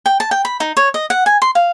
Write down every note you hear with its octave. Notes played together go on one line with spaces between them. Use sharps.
G5
A5
G5
B5
D#4
C#5
D#5
F#5
G#5
C6
F5